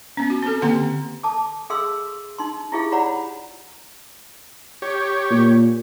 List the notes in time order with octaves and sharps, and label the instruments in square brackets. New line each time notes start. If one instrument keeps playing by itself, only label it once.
[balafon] B3 C#4
F#4
C4 A4
D3 A#3 C4 G4 F#5 A#5
[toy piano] A4 A5 D6
G#4 A4 F5 C6 E6
D#4 C6
E4 F4 G4 G#4 F5
C#5 D5 F5 F#5 A#5 B5
[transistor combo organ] G4 C#5
[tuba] A#2